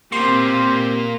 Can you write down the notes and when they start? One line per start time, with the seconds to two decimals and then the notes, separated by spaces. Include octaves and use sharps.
0.12 A#3 C4 F4 G4 C6